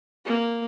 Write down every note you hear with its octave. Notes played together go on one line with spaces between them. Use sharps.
A#3